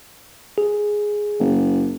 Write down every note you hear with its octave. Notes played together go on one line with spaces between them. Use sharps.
G#4
F#1